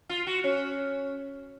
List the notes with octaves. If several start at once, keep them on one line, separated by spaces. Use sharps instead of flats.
F4
F#4
C#4